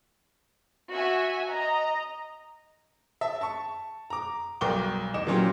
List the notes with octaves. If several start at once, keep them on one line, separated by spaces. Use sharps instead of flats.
F#4 E5 G#5
D#5 A#5
E5 A5
A5 C#6
A#5 D6
B1 G3 A#4 G5 D6 G7
E2 D#5 D6 E7
A#2 E3 F#3 C#4 F4 G4